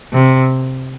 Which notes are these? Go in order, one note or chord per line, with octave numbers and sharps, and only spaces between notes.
C3